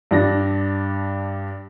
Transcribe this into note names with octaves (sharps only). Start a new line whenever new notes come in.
G2 D4 A#6